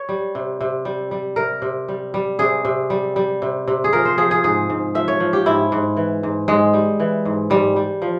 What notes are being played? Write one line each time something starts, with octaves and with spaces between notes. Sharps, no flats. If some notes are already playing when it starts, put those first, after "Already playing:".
Already playing: C#5
G3
C3
C3
G3
G3
C3 A#4
C3
G3
G3
C3 G#4
C3
G3
G3
C3
C3
G#4
F3 A#4
C5
F3 G#4
G#4
G#2 G#4
G#2
F3 E5
C#5
F3
G4
G#2 E4
G#2
E3
G#2
G#2 G#3
G3
E3
G#2
G#2 G3
G3
F3